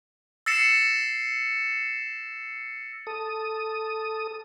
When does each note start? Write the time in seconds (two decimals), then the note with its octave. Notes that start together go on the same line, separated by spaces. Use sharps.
0.46 E6 A6 A#6 C7 C#7 E7
3.07 A4 D#6